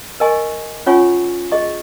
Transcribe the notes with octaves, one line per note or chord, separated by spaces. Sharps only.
A#4 D#5 G#5 C#6
C#4 F4 C#5 G#5 C#6
G#4 D#5 C#6